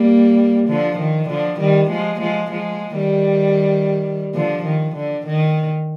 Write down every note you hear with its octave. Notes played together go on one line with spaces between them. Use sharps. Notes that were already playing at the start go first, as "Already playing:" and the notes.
Already playing: G3 A#3
D3 F3
D#3
D3 F3
D#3 G3
F3 G#3
F3 G#3
F3 G#3
D#3 G3
D3 F3
D#3
D3
D#3